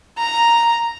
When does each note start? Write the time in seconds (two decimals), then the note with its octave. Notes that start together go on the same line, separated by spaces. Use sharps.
0.18 A#5